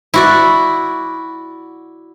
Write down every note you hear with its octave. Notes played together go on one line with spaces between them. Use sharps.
E4 F#4 D5